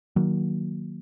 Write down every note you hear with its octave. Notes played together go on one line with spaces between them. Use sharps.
D#3 F#3 A#3